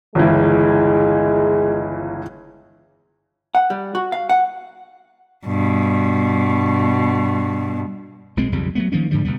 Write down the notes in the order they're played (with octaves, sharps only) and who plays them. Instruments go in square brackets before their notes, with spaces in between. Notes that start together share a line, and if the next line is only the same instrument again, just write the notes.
[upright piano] G1 C#2 E3 [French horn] G#3
[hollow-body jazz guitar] F#5
G3
F#4
F5
F#5
[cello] G2 B2
[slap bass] B1 A#2 G#3 C4
B1 F2 C#3 G3
F#3 G3 A3 B3
D#3 F3 A#3 C#4
G#2 D3 F3 G3
C#2 B2 G3 B3